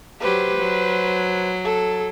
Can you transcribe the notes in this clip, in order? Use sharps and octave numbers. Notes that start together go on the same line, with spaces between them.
F#3 G4 B4 C5
F#3
A4